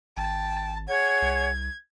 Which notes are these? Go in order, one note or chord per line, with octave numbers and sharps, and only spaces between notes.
G#1 G5 A5
G#4 C#5 F#5 G#6
C2